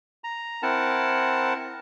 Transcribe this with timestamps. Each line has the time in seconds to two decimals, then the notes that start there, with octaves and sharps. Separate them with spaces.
0.24 A#5
0.63 C4 E4 A#4 F#5 A5